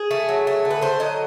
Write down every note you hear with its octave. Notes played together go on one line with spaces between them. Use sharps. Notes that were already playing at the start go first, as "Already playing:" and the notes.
Already playing: G#4
A3
F#3
A3
D3
B4
D3 C5
F#3 D#5